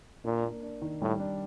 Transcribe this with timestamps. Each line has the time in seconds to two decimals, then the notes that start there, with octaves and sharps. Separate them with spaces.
0.24 A#2 D4
0.44 A#3
0.63 D4
0.82 D#3
1.01 A2 G3
1.20 D4